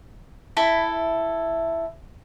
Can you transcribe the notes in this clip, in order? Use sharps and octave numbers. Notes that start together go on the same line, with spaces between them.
E4 A4 B5